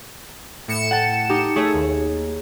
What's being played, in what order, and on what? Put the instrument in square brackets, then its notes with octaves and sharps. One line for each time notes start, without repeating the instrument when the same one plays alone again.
[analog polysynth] A2 C#7 E7
[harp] F#5 G5 A5
D#4 G4
[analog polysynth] A3 [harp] G#4 C#5
[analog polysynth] D#2